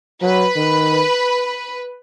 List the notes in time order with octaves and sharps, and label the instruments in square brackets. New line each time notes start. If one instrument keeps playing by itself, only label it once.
[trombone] F#3 [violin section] B4
[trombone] D#3